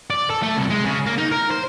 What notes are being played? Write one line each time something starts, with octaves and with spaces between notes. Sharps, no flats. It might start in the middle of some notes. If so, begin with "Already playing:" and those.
D5
A4
A3
C2
G#3
C#3
A#3
D#4
A#4
C5